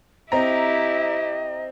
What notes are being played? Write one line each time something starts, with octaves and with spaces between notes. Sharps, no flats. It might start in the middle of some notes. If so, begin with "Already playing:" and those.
C4 E4 G4 D#5 A#5